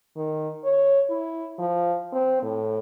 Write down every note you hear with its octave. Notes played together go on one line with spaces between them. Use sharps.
D#3
C#5
E4
F3
C4
A2